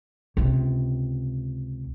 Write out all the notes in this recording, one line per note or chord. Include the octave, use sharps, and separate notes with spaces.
C#2 C3